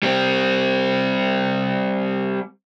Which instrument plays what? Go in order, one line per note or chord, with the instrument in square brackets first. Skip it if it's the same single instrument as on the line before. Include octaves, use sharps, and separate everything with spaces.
[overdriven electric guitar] G3 C4